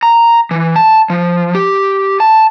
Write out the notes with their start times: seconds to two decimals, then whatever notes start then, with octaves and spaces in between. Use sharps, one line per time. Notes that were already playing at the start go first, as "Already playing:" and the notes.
0.03 A#5
0.51 E3
0.76 A5
1.10 F3
1.55 G4
2.20 A5